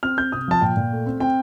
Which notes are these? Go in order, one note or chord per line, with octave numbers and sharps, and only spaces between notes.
C4 F6
C4 G6
C3 D#6
F3 A5
A#2 G5
A#2
A3
C4
C4 G5